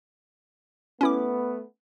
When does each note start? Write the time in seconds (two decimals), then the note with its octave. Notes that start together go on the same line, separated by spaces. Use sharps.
1.01 A3 B3 C#4 E4 D6